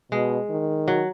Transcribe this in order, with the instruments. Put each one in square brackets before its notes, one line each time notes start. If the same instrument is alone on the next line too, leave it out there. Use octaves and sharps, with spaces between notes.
[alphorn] B2 [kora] G#3
[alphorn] D#3
[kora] F#3